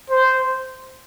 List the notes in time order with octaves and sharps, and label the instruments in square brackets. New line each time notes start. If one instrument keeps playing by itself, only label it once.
[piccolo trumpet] C5